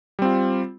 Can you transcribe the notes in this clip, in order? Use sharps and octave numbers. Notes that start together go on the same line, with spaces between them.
G3 C4 F4